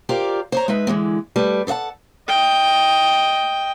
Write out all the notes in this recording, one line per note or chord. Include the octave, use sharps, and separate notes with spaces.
F4 G4 A#4 C5 D5
C5 C#5 A#5
G#3 D#4 B4 E5
D3 E3 G#3 C4
G3 A3 B4
A4 C5 E5 F#5 A5
D#5 G5